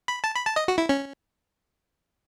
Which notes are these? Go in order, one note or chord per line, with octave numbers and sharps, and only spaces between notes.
B5
A5
B5
A5
D#5
F#4
E4
C#4